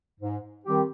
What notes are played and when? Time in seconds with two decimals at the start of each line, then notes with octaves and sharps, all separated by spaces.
0.20 G#2
0.66 D#3 G3 C4 G4